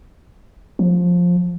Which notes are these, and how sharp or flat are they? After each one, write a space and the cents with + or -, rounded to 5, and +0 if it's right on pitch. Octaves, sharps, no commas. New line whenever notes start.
F3 +15